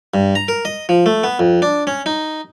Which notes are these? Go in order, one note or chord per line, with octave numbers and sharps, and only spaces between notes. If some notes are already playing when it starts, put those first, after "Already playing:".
G2
A#5
A#4
D#5
F3
A3
B3
F2
D4
C#4
D#4